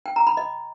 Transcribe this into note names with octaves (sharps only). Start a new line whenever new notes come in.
G5
A#5
B5
D#5